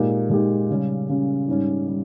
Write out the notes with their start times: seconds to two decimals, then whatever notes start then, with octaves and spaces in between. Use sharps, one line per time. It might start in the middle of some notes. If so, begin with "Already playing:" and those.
Already playing: A#2 G#3 D#4 G4
0.29 A#2 G#3 D#4 G4
0.70 C#3 G3 C#4
1.09 C#3 G3 C#4
1.48 G#2 G3 C#4
1.88 G3 C#4